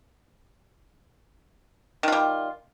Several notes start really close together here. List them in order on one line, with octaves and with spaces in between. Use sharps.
D#3 F4 G3